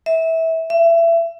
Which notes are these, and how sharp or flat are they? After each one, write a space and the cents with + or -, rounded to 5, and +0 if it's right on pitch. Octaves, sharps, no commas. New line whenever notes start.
E5 -20
E5 +25